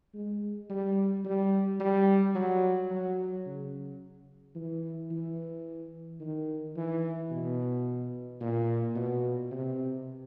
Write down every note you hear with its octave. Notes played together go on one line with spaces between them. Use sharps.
G#3
G3
G3
G3
F#3
F#3
C#3
E3
E3
D#3
E3
B2
A#2
B2
C3